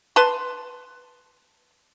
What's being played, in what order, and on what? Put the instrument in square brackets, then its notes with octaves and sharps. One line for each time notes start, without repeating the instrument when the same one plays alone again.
[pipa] B4 A5 C6